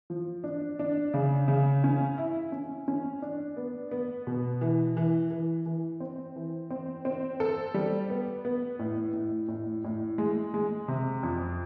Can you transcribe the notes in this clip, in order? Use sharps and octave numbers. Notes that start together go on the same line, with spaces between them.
F3
D4
D4
C#3
C#3
C#4
E4
C#4
C#4
D4
B3
B3
B2
E3
E3
E3
E3
C4
E3
C4
C4
A4
G3
B3
B3
A2
A2
A2
A2
G#3
G#3
C3
F2